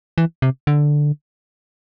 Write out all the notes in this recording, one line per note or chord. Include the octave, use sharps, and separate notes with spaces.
E3
C3
D3